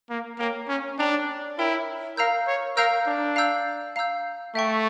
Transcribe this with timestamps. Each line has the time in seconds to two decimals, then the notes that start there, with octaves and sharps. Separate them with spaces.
0.10 A#3
0.39 A#3 A#4 C#5 G5 A#5
0.69 C#4
0.99 D4 A#4 C#5 G5 A#5
1.58 E4 A#4 C#5 G5 A#5
2.17 A#4 F5 A#5 E6 G6
2.47 C#5
2.76 A#4 F5 A#5 E6 G6
3.07 D4
3.36 F5 A#5 E6 G6
3.96 F5 A#5 E6 G6
4.55 A3 E5 G5 C#6